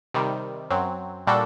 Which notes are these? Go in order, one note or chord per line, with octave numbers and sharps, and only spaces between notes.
C3 D#3 G3
F#2 F#3 C4
A#2 G3 D4 F#4 A4